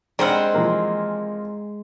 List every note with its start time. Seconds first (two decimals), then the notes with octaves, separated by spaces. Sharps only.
0.19 D#3 G3 G#3 C4 D4 C5 F#5 F6
0.54 E3 F3 A#3